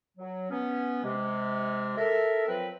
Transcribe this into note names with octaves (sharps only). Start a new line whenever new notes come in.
F#3
B3 C#4
C3 G#3
A4 A#4 E5
F3 F#3 C4 B4